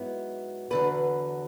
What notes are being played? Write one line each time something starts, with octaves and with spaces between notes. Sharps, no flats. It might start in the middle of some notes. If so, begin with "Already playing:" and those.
Already playing: G#2 F#3 B3 E4
E2 D3 F#3 B4